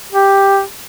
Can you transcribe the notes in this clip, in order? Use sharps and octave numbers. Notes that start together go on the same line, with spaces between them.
G4